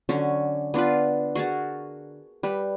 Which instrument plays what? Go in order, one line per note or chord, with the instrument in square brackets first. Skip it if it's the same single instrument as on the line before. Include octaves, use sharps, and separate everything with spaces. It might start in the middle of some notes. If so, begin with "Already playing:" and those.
[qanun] D3 F#3 C#4
B3 D4 F4 B4
F#4 G#4 A#4 A5
G3 B4